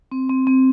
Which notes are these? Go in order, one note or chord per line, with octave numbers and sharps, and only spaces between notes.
C4
C4
C4